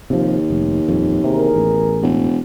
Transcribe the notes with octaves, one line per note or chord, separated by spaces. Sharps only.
D#2 C3 F3
F1
D#1 F2
E2 C3 G#4 A#4
A1
E1